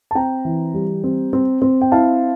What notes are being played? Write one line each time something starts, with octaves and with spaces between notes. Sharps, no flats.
A5
C4 G5 A#5
E3
G3
C4
C4
C4
G5
E4 F5 A5